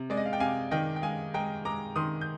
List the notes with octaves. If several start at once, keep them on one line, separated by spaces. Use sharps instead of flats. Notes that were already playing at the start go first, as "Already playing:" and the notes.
Already playing: C3
G#3 D5
D#5
F5
G5
C3 F5 G#5
D#3 D#5 G5
G5
G#3 F5 G#5
G#3 G5 A#5
G#3 A#5 D6
D#3 C6 D#6
G6